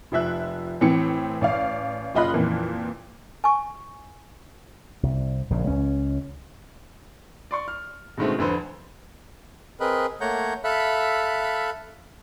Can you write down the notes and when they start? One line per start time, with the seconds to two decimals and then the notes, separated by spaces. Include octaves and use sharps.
0.12 F1 F3 E5 F#6
0.81 A2 E3 C4 C#7
1.41 A1 D5 F5
2.15 F#1 F4 D#5 B5 F#6
2.34 F2 A#2 E3
3.44 G#5 C#6
5.03 C2
5.50 A#1 C#3
5.67 C#2 C#4
7.51 D5 C6 C#6
7.68 F6
8.17 B2 D3 D#3 G#3 A3 C4
8.39 F1 D3 B4 C5
9.80 C4 G#4 A#4 B4 D#5 B5
10.21 A3 A#3 C#5 F#5 A#5 G6
10.64 A4 E5 F5 B5 F#6